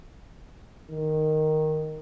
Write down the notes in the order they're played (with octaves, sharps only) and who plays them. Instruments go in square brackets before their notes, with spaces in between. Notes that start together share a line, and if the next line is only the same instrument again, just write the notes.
[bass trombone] D#3